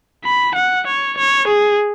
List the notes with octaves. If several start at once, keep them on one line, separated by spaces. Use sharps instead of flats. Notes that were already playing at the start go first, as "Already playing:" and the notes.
B5
F#5
C#5
C#5
G#4